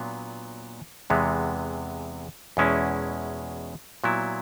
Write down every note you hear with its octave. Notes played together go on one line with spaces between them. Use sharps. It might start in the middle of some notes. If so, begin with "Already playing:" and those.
Already playing: A#2 F#3 B3 D4
E2 C3 E3 G#3 B3
E2 B2 G#3 C#4 E4
A#2 F#3 B3 E4